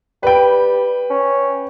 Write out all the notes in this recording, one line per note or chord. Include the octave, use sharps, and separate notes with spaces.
G3 B4 G5
C#4